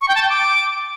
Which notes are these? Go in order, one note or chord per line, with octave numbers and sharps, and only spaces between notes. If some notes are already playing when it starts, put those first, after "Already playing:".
C#6
G5
A5
G5
D6